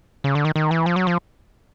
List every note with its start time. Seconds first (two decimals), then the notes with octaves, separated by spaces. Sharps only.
0.24 C#3
0.35 D3
0.45 D#3
0.56 D#3
0.71 E3
0.86 F3
0.96 F#3
1.07 F3